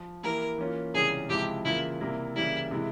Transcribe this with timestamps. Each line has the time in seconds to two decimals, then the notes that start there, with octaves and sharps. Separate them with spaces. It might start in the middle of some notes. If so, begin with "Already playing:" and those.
Already playing: F3
0.23 E3 A#3 E4 G4 A#4
0.58 E3 A#3 C#4 F4
0.94 C#2 C3 E3 G3 C#4 G#4
1.29 C#2 C3 F3 G#3 E4 G4
1.65 C#3 E3 A#3 E4 F4
2.00 C3 G3 A#3 E4
2.35 C#3 E3 G3 A#3 E4
2.71 C3 E3 G#3 E4